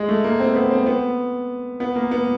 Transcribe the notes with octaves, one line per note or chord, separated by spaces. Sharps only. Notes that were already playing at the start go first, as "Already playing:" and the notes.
Already playing: G#3
A3
A#3
C4
B3
C4
B3
B3
A#3
B3